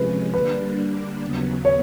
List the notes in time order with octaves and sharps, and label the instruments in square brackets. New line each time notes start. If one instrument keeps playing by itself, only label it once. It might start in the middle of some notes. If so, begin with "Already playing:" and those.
Already playing: [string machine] C3 F3 G#3 C#4 [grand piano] B4
[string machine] D3 G3 A#3 D4 [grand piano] B4
[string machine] D#2 C#3 F#3 B3
[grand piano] C#5